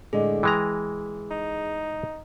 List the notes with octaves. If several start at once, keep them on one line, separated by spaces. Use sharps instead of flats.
A2 D3 G#3 G#4
E3 G#3 G5 A#5
D#4